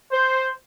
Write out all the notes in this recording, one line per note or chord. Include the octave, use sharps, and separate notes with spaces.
C5